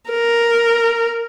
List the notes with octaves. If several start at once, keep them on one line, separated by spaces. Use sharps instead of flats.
A#4